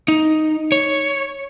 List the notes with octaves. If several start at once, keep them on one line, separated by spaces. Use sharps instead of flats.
D#4
C#5